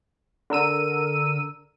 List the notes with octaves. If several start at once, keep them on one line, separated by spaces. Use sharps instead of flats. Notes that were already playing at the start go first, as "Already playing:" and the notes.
D3 A#4 E6 D#7